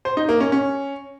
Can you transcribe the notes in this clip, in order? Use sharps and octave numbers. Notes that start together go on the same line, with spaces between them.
C5
D#4
A#3
C#4
C#4